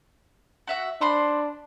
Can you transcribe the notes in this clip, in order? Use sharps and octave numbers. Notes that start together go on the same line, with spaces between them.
F#4 E5 F#5
D4 C5 B5 C6